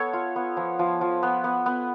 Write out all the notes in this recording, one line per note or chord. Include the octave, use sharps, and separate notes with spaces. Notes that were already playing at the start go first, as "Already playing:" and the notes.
Already playing: B3 A4 C#5
F4
B3
F3
F3
F3
B3
B3
B3